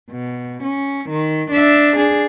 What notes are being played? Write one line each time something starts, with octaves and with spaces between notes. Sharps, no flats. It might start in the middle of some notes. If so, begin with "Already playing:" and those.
B2
C#4
D#3
D4 E5
D4 G#4